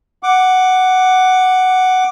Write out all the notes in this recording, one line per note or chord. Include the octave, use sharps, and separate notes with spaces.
F#5 D6